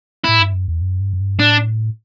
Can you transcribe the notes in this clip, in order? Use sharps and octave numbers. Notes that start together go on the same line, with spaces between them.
A2 E4
G2
F#2
E2
F#2
G2
F#2
G2
A2 D4